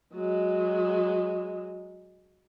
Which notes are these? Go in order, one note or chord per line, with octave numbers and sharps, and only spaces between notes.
F#3 G#3